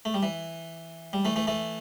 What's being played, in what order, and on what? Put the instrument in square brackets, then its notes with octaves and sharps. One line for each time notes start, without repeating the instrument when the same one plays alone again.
[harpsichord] A3
G3
E3
G3
E3 A3
E3 A3
E3 A3